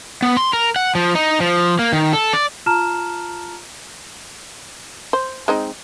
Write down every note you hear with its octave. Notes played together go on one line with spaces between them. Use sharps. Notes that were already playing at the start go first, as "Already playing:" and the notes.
B3
C6
A#4
F#5
F3
D#4
F3
A#3
D#3
A4
D5
F4 A5 A#5 F6 E7
C5
G#3 C4 D#4